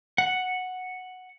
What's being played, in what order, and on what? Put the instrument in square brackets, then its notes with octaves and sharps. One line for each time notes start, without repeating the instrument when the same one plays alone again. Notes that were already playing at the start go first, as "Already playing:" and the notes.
[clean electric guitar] F#5